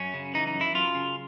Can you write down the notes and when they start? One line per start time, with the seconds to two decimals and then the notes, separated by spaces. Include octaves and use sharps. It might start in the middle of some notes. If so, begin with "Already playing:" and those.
Already playing: F#2 C#4
0.14 C#3
0.34 E3 D#4
0.47 D#4
0.54 F#2
0.61 E4
0.74 F#2 F4
0.95 C#3